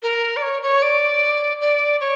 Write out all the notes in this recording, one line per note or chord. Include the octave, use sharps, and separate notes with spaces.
A#4
D5
C#5
C#5
D5
D5
C#5